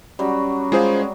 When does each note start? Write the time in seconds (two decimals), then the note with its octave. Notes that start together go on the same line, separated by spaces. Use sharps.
0.19 F#3 G3 C#4 F#4
0.72 G#3 F4 G#4 C5 F5